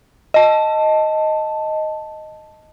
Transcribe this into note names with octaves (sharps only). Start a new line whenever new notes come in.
D#5 A5